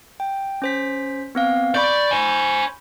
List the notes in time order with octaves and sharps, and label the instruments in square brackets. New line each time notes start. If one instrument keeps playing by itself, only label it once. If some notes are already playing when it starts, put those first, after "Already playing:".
[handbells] G5
C#4 C5 B6
B3 C4 F5
[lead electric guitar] D5 [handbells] B5 C#6 G6
[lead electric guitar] C5 G#5